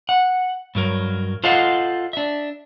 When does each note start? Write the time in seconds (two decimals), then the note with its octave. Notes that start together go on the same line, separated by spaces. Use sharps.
0.09 F#5
0.75 G2 F#3 A#4
1.44 F4 A4 C5 D#5 F5 F#5
2.13 D4 E5